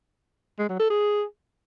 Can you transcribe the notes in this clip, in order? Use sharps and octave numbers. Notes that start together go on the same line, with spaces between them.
G#3
F#3
A4
G#4